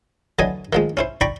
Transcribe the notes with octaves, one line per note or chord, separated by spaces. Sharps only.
D3 E3 F#3 D#5 G#5
D#3 F3 G#3
C#4 E4 C5
D5 G5 A#5 B5 C#6